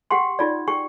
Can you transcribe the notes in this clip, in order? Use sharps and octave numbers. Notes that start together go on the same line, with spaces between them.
G4 F#5 G5 C6
D#4 F4 D5
G4 G5 C#6